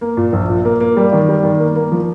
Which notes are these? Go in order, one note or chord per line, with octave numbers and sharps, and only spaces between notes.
A#3
A#2
A#1
A#2
A#3
A#3
G3
D#3
G3
D#3
A#3
A#3
F3